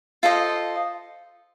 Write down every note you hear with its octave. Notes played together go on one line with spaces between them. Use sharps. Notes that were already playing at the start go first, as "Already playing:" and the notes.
F4 A4 C5 D#5